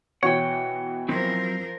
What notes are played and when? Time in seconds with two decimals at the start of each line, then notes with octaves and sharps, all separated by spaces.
0.23 B2 E3 F#4 C#5 F#5 G5
1.09 F3 F#3 C4 E4 A#4